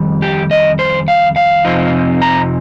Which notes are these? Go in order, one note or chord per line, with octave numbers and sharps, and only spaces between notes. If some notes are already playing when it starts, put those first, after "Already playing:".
Already playing: F2 D#3 G3
G4
D#5
C5
F5
F5
F2 C3 F3 C4 D#4
A#5